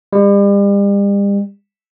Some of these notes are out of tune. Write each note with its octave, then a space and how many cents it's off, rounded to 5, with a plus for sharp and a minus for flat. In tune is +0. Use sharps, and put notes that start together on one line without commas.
G3 +40